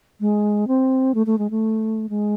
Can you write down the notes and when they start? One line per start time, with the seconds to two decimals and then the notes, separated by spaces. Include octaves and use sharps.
0.20 G#3
0.68 C4
1.14 A3
1.26 A3
1.38 G#3
1.50 A3
2.09 G#3